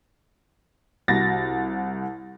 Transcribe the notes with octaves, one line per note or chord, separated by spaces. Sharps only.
C2 F#4 A6 A#6